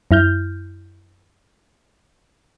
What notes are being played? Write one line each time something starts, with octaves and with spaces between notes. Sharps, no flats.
F#2 E4 F6 G6